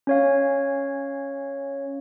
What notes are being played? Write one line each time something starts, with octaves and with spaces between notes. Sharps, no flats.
C#4 C#5 F5